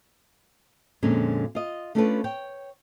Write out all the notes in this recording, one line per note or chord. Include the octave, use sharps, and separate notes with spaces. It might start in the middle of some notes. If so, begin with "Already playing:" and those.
F2 A#2 D3 G#3 C#4
F4 D#5
A3 C#4 D4 F4 A4 B4
C#5 G5